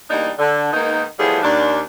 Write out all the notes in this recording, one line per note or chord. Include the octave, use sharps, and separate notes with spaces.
E2 G3 A#3 D4 D#4
D3
D#3 G#3 A#3 B3 D#4
A2 E3 F3 G3 B3 G#4
D#2 D4